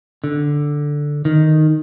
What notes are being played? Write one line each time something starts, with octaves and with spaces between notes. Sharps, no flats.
D3
D#3